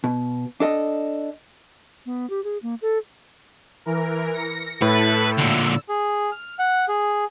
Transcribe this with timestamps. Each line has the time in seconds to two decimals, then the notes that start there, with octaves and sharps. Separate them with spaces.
0.04 B2
0.60 D4 A4 D#5
2.06 B3
2.30 G4
2.44 G#4
2.62 A#3
2.82 A4
3.86 E3 A#4
4.34 A#6 C#7
4.82 A2 E4 A4 B4
5.38 A#2 D3 E6
5.89 G#4
6.32 F6
6.59 F#5
6.88 G#4